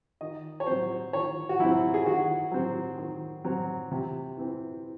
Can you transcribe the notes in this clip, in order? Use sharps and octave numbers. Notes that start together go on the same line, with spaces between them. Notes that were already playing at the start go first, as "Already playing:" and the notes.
D#3 D#5
C#5
F#3 C4 C5
D#3 C#5
F#4
F#3 C4 E4
G#4
D#3 F#4
F#3 C4
D#3
F#3 C4
C3
E3 C4